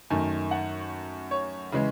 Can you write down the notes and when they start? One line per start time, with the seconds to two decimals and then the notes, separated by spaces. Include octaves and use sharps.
0.10 F#2 D#3 A3 G#5
0.51 F#5
1.31 C#5
1.72 C#3 E3 G#3